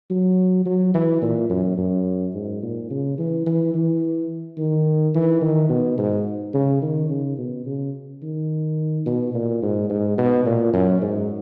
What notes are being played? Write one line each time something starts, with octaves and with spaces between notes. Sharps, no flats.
F#3
F#3
E3
A#2
F#2
F#2
G#2
A#2
C#3
E3
E3
E3
D#3
E3
D#3
B2
G#2
C#3
D#3
C#3
B2
C#3
D#3
B2
A#2
G#2
G#2
B2
A#2
F#2
G#2